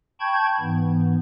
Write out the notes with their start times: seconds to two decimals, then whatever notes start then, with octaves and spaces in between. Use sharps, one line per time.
0.20 G5 A5 B5 C#6 G6 G#6
0.61 G#2 E3 B3